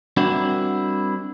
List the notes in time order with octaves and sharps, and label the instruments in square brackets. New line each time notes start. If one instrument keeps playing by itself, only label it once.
[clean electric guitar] G3 C4 D4 E4 F#4 A#4